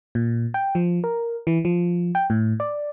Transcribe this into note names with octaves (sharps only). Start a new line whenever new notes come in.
A#2
G5
F3
A#4
E3
F3
G5
A2
D5